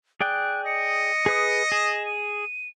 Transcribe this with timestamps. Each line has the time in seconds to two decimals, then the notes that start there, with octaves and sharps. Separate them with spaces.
0.21 G#4 D5 G5 F#6
0.66 D#5 C#7
1.26 G#4 B4 D#6
1.72 G#4 E7
2.06 D#7